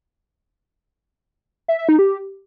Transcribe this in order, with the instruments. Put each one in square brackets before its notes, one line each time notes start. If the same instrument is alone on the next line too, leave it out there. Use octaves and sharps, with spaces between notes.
[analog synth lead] E5
E5
D#4
G4